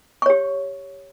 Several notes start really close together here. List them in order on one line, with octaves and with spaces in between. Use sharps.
C#6 C#5 G4